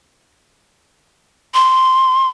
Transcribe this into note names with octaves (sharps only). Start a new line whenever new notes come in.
C6